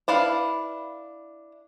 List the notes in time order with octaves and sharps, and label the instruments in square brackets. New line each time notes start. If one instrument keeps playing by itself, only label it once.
[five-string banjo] D4 E4 B4 F5